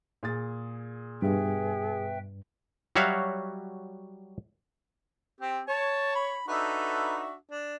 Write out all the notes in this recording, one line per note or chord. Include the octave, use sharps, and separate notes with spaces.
A#2 G#4 A6
G2 B2 G#4 B4 E5 G5
F#3 G3 F#4 C#5 E5 F5
C4 G4
C#5 A5
B5
D4 D#4 F#4 A4 B4 E5
D4